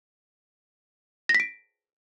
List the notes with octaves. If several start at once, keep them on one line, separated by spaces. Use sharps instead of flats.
A#6
B6
D7